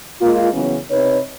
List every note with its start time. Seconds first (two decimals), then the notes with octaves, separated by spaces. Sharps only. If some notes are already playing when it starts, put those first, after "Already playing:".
0.21 G#3 A#3 F4
0.53 C#3 E3 F#3 B3 C#4
0.91 C3 D#4 B4 C#5